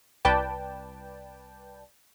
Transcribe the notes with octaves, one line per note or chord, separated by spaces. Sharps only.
C2 B4 D5 G5 A5